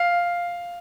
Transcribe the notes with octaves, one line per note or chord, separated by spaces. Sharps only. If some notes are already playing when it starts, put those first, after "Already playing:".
Already playing: F5